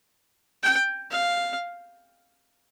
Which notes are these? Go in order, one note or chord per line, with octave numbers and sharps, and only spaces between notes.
G5
F5